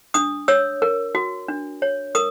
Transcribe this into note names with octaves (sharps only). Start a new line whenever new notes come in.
D4 D#6
C#5 E6
A#4
F#4
D4
C#5
A#4 D#6